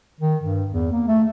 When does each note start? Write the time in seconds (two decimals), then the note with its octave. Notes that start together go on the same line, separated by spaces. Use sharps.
0.20 D#3
0.43 G2
0.71 E2
0.92 A#3
1.08 A3